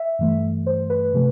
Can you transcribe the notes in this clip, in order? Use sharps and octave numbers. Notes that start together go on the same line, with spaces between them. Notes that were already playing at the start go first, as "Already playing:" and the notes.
Already playing: E5
G2 E3 A3
C5
B4
C3 F3 A3